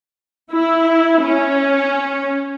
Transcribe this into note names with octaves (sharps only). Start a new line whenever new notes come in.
E4
C#4